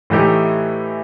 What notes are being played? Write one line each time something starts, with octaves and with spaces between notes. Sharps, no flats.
A2 E3 A3 D#4 G4